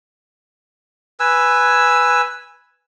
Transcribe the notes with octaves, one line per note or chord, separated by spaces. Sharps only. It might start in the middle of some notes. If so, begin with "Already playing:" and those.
B4 G#5 E6